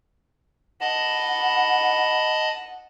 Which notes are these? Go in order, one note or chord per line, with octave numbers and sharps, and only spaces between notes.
D#5 F#5 A5 B5